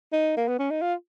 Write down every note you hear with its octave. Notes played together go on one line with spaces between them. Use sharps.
D#4
A#3
B3
C#4
D#4
F4